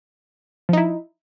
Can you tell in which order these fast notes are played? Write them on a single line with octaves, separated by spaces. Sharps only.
F3 D#4 E4